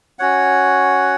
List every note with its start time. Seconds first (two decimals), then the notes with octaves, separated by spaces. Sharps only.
0.19 C#4 F#4 C#5 F#5